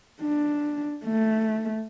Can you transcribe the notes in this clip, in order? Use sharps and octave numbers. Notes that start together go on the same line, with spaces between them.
D4
A3